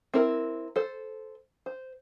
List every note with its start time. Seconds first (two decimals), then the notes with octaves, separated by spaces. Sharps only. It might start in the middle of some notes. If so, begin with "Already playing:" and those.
0.14 C4 E4 A#4
0.76 A4 C5
1.66 C5